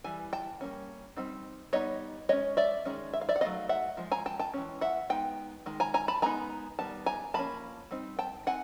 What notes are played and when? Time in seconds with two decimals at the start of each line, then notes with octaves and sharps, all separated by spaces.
0.04 E3 G3 G#5
0.33 G5 A5
0.61 G3 A#3 C#4
1.17 G3 C4 D#4
1.73 G3 B3 D#4 C#5 D#5
2.29 G#3 C#4 C#5 D#5
2.57 D5 E5
2.85 D#3 G#3 C#4
3.14 E5
3.21 F5
3.29 D5 E5
3.36 F#5
3.41 F#3 A3 C4 D#4 D#5 F5
3.69 E5 F#5
3.97 F3 G#3
4.12 G#5 A#5
4.26 G5 A5
4.39 G5 A5
4.54 E3 G#3 C#4
4.81 E5 F#5
5.10 G#3 B3 D#4 G5
5.66 D#3 G#3
5.80 G#5 A#5
5.94 G#5 A#5
6.08 A5 B5
6.22 G#3 B3 D#4 G#5 A#5
6.79 D#3 G3 B3 A5
7.06 G#5 A#5
7.34 F3 A#3 C#4 A5 B5
7.91 G3 C4 D#4
8.19 G5 A5
8.47 C4 D#4 F#5 G#5